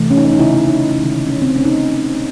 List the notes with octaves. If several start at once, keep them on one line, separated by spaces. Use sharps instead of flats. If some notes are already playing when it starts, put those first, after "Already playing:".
Already playing: C3 E3 A3
C#4
D#4
C#4
D#4
C#3 E3 A3 E4
E4
D#4
C3 D#3 G#3
C#4
C4
D#3 A3 C#4
D#4